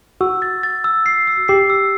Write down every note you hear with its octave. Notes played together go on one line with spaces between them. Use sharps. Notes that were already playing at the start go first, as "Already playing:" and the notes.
F#4 E6
A6
A6
E6
C7
E6
G4 C7
E6